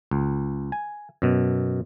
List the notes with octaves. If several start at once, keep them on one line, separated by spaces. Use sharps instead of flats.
C#2
G#5
F#2 B2